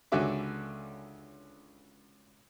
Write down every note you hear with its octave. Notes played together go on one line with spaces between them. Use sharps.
C#2 D3 C#4 F#4 E5 D6